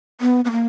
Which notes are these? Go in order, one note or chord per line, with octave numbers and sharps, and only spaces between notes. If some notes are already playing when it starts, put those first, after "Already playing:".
B3
B3
A#3